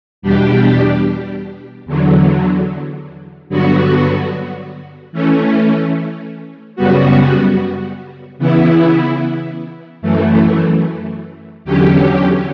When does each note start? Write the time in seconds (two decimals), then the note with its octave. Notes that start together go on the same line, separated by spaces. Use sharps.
0.22 E2 B2 G3 D4 G4
1.86 E2 D3 F#3
3.49 G2 D3 F#3 B3 F#4
5.12 E3 A3 C#4
6.76 F#2 C#3 G3 B3 F#4
8.38 C#3 E3 B3 E4
10.02 F#2 E3 A3
11.65 E2 D3 F#3 C#4 G4